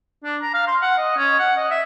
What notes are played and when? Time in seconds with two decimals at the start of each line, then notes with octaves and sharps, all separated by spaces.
0.24 D4
0.42 A#5
0.54 F5
0.68 C6
0.82 F#5
0.98 D#5
1.17 C#4
1.39 F#5
1.57 D#5
1.71 E5